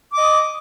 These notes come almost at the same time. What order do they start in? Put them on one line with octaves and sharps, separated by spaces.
D6 D#5 D#6